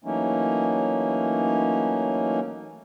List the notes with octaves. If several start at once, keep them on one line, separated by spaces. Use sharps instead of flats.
E3 F#3 A3 A#3 C#4 D#4